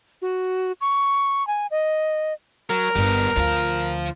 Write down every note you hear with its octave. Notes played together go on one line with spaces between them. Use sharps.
F#4
C#6
G#5
D#5
F#3 A#4
G1 G3 B3
D2 F3 F4